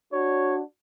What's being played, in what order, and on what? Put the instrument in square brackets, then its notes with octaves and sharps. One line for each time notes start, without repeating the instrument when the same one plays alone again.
[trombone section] D4 F#4 [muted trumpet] C#5